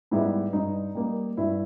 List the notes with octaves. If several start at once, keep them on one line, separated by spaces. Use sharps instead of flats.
G#2 G3 B3 E4
G2 D#4
G3 A#3
G2 E4